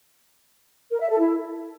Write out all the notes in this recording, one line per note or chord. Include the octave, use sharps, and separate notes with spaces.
A#4
E5
A4
E4